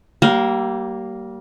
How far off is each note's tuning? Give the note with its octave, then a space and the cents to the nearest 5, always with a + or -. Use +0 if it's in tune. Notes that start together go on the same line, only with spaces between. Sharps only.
G3 -30 A#3 +0